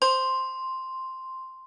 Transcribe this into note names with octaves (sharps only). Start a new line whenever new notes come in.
C5 C6